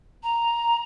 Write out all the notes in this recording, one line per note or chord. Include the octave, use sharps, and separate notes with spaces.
A#5